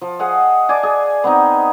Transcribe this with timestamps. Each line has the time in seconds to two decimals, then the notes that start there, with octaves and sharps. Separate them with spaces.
0.01 F3
0.19 G#4 D#5 F5 F#5
0.69 D5 G#5 A5 D6
0.83 G#4
1.24 B3 C4 D#4